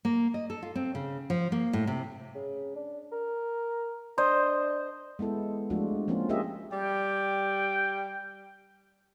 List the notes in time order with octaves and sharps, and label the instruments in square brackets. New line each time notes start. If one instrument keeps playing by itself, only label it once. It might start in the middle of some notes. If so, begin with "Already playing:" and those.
[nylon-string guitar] A#3
D#5
A4
F4
C4
C#3
F3
A#3
A2
C3
[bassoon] C#3
D4
A#4
[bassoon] D4 [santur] C5 D#5
[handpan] G#3 B3 E4 A4
F3 G#3 A3 D4 F4 F#4
F3 A#3 C4 C#4 F4
F4 G4 G#4 A#4 D#5 E5
[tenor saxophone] G3 [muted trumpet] G5